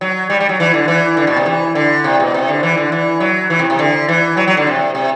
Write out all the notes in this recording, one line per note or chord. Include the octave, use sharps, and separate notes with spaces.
F#3
G3
G3
F#3
E3
D3
E3
D3
B2
C3
E3
D3
C3
B2
C3
D3
E3
D3
E3
F#3
E3
C3
C3
D3
E3
F#3
F#3
D3
C3
C3